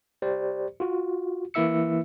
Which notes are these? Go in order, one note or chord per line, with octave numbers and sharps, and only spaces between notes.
G4 C5 D5
F4 F#4
E3 A#3 E4 E5 E6 C#7